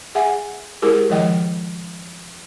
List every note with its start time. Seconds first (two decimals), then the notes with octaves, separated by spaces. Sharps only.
0.15 G#4 E5 F#5 G#5
0.82 G#3 E4 G4 G#4 A#4
1.10 D#3 F3 G#3 E4 D#5 G5